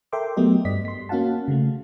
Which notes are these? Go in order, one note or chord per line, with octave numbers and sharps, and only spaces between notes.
A4 A#4 E5 G5 C6 D6
F#3 A3 B3 G4 D#5
G2 D5 D#5 B6
C6 B6
A#3 C#4 F#4 F5 F#5 A5
C#3 A3